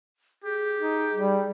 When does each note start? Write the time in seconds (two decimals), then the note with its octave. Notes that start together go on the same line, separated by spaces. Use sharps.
0.44 G4 G#4
0.80 D#4
1.15 G3